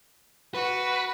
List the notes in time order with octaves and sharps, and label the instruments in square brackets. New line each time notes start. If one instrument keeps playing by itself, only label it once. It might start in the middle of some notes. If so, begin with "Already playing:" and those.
[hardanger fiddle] F#4 [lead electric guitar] B4